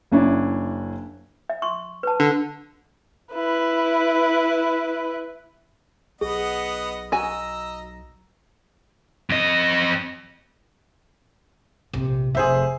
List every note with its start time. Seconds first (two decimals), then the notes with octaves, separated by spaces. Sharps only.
0.12 F#1 C#4 D4 E4
1.50 E5
1.62 C6 C#6
2.03 B4 A5
2.20 D3
3.34 E4 B4
6.21 B1 B3 G#4 D#5 F#5
7.12 F#4 D#5 G#5 A#5 E6
9.30 F2 D#5
11.93 A#1 C3
12.35 F1 G#4 C5 E5